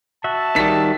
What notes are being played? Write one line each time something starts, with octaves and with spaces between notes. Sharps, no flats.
F#4 E5 A5
D#3 G3 B6